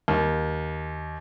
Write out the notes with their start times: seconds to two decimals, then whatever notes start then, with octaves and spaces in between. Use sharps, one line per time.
0.08 D#2